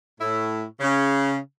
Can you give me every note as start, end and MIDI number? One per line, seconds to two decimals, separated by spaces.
0.21 0.63 45
0.21 0.63 64
0.80 1.36 49